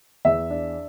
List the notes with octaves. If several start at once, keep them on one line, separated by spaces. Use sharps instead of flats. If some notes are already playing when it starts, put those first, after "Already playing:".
E2 E5
D4